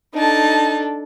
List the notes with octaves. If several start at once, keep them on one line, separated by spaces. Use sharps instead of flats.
D4 D#4 A4 A5